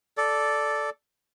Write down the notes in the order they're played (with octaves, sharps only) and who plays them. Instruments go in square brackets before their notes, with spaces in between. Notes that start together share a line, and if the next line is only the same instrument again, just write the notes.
[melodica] A4 D5